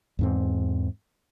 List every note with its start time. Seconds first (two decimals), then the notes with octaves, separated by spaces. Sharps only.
0.19 E2 G#2 C4